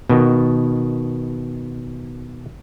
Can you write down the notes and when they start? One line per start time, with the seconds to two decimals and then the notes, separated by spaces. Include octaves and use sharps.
0.10 B2 D#3